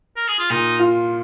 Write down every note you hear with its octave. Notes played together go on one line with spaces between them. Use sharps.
A#4
G#4
F4
A#2 D#4
F4